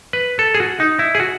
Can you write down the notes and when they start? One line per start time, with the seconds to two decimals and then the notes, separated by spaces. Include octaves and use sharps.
0.13 B4
0.39 A4
0.54 G#4
0.60 F#4
0.80 D#4
0.99 E4
1.15 G#4
1.20 F#4